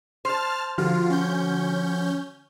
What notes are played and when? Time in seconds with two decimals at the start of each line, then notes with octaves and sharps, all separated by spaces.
0.25 C5 A5 F6
0.78 D3 F3 F4 F#4 F6
1.10 C#4 G6